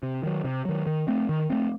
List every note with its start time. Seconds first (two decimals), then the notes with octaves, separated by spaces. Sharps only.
0.03 C3
0.23 D#3 F#3
0.45 C3
0.65 D#3 F#3
0.87 D#3
1.08 A3 C4
1.29 D#3
1.50 A3 C4